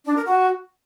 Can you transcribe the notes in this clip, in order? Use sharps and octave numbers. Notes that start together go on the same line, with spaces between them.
D4
A#4
F#4